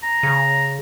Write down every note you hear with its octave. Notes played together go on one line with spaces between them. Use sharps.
A#5
C#3